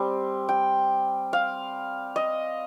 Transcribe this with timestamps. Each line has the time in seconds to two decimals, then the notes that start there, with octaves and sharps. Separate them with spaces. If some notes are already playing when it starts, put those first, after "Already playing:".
Already playing: G3 C4
0.49 G5
1.33 F5
2.16 D#5